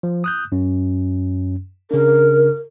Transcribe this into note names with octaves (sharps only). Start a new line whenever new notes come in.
F3
D#6 F#6 G6
F#2 C#4
C#3 D4 A#4